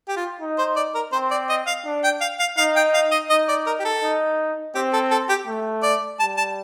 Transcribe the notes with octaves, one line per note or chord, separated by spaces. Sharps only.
G4
F4
D#4
C5
D5
A#4
C4 C5
D5
D#5
F5
D4
G5
F5
F5
D#4 F5
G5
F5
D#5
D#4 D#5
D5
A#4
G4
A4
D#4
C4 G4
A4
A4
G4
A3
D5
G3 A5
A5